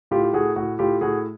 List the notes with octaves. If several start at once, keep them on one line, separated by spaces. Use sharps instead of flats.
A2 F4 G4
G4
A2 F#4 G#4
A2 F#4
A2 F4 G4
A2 F#4 G#4